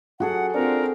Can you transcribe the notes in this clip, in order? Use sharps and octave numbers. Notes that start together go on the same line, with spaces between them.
F#3 F#4 G#4 A4 F#5
C4 D4 F4 A#4